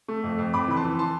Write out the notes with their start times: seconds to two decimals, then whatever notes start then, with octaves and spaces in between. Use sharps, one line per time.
0.08 A3
0.24 F2
0.38 F2
0.53 F2 B5 D6
0.68 E3 B5
0.76 A5 C6
0.84 E3
0.99 A5 C6